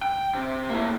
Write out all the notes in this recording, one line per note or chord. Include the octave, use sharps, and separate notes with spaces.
G5
C3
A#3 E4